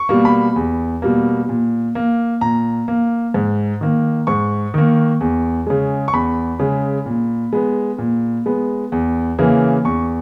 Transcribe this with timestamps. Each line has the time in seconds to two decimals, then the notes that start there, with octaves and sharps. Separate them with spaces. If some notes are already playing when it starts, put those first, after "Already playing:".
Already playing: C#6
0.09 B2 G3 A#3
0.25 B5
0.56 E2
1.02 B2 G3 A#3
1.49 A#2
1.95 A#3
2.41 A#2 A#5
2.88 A#3
3.34 G#2
3.81 D#3 A#3
4.27 G#2 C#6
4.74 D#3 A#3
5.21 E2
5.67 C#3 G#3
6.08 C#6
6.13 E2 B5
6.59 C#3 G#3
7.06 A#2
7.53 G#3 B3
7.98 A#2
8.46 G#3 B3
8.92 E2
9.39 C#3 E3 A#3
9.85 E2 C#6